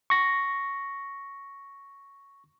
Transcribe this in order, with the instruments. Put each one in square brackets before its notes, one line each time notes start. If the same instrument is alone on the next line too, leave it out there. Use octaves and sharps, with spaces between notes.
[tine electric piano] C#6 A#6